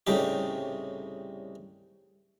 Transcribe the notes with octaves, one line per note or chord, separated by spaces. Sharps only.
C2 A2 C#3 G3 D#4 G4